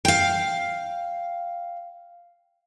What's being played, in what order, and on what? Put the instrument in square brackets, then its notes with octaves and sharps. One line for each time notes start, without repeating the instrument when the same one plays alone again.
[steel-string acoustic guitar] F5 G5